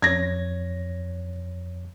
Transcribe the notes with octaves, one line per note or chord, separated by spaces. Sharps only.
F2 C#5 G#6 A#6